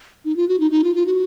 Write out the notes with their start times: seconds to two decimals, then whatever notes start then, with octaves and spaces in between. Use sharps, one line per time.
0.25 D#4
0.36 F4
0.48 F#4
0.60 D#4
0.71 D#4
0.84 F4
0.95 F4
1.06 F#4